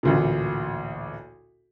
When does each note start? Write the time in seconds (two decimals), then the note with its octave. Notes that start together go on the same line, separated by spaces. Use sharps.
0.03 A1 D2 A#2